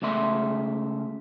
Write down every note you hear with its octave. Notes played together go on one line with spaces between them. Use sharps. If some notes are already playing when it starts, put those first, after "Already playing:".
C#2 C#3 A3 E5 C6